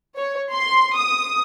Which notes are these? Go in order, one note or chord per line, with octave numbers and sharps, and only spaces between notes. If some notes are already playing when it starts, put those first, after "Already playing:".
C#5
C6
D#6